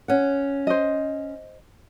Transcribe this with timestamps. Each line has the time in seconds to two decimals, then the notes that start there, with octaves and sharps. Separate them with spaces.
0.08 C#4 F#5
0.67 C5 D#5